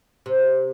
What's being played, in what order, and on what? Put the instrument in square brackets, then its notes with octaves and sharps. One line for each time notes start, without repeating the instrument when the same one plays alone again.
[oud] C3